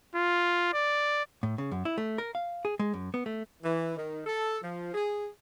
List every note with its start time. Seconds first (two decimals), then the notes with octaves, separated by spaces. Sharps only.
0.15 F4
0.73 D5
1.43 A2
1.58 C#3
1.72 F#2
1.85 E4
1.98 A3
2.18 A#4
2.35 F5
2.65 G#4
2.79 G#3
2.94 F#2
3.14 B3
3.26 A3
3.63 E3
3.95 D#3
4.25 A4
4.62 F3
4.94 G#4